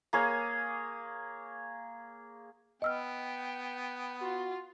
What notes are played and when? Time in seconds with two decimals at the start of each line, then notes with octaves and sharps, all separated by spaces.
0.13 A#3 G#4 C#5
2.82 B3 D#5 G5 E6 F6
4.21 F4 F#4